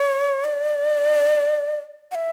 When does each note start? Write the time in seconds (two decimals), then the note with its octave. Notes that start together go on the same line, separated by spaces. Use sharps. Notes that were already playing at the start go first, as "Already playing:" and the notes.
Already playing: C#5
0.45 D5
2.11 F#5
2.15 E5